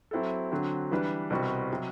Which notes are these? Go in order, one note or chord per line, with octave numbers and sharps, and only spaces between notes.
F#3 C4 E4 A4
D3 F#3 C4
E3 G3 D4 G4 B4
C2 B2 G3 C4 F#4
C3 F#3